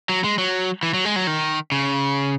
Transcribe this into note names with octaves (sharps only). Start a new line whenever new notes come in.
F#3
G#3
F#3
E3
F#3
G#3
F#3
D#3
C#3